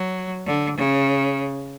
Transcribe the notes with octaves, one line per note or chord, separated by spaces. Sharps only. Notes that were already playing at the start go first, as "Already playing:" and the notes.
Already playing: F#3
D3
C#3